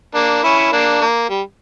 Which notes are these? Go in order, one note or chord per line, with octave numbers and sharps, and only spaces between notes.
A#3 D4
C#4 E4
A#3 D4
A#3
G3